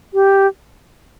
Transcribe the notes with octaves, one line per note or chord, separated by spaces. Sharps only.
G4